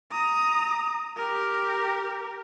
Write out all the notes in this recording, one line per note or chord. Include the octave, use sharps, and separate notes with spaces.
A#5 D#6
G4 A#4